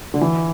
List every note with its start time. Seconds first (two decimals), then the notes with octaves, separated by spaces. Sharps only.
0.14 D3
0.21 E3